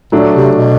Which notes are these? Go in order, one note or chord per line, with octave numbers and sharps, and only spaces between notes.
A#2 F#3 A3 D4
C3
B2